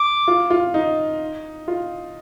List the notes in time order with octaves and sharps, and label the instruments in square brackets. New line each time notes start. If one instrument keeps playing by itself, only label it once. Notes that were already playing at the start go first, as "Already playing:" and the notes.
Already playing: [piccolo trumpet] D6
[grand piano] F4
F4
D#4
F4